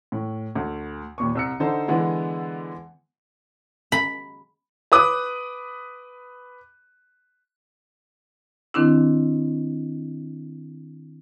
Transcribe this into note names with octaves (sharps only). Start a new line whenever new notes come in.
A2
D2
D#2 A#2 C#6
C2 E6 C#7
D3 D#4 A4 C5
D3 E3 G#3 B3 E4
B5
B4 D6 D#6 F#6
D#3 C4 D4 E4